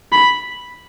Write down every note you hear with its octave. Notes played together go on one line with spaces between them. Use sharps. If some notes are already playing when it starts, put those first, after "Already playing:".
B5